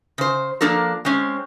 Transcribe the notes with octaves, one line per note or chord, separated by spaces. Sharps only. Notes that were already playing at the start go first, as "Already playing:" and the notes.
C#3 C5
F3 A#3 D4 A4 A#4
G#3 C4 C#4